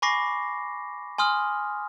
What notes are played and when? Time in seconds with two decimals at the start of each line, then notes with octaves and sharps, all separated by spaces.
0.02 G#5 B5 C#6 D6 A#6 C7
1.18 G#5 C6 D#6 F6